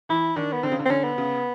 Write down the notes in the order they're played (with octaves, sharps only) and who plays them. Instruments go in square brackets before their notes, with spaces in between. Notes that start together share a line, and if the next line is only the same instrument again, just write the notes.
[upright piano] E3 [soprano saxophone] E4
[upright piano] D#3 [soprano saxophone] D4
[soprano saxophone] B3
[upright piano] D3 [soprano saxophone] C4
[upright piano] C#3
D3
[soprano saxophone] C4
[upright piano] D3 [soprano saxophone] C#4
[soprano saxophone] B3
[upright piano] C#3